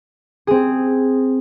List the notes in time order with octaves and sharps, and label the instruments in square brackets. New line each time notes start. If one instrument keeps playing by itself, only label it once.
[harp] C4 G#4